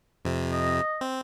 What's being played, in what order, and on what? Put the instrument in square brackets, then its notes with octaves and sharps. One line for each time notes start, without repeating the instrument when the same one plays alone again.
[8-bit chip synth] F2 C3
[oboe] D#5
[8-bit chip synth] C4